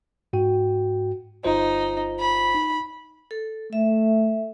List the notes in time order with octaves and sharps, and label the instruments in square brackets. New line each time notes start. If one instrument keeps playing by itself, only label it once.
[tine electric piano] G#2 F#4 G5
[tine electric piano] G1 F4 C5 [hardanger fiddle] D#4
[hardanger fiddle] B5
[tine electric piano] D#4
[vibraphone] A4
[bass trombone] A3 [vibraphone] E5